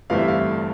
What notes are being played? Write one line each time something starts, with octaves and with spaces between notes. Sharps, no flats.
G1 G2 E3 A3 C4 F5
E5
F5